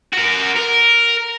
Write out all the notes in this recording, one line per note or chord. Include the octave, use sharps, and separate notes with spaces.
F#4 A#4
A#4